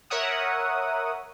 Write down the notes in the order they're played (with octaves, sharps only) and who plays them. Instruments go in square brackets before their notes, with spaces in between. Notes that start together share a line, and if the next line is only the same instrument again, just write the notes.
[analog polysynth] A#4 C#5 E5 F#5 D#6